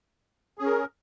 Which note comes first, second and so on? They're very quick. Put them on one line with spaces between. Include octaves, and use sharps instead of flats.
G#4 C#4 A#4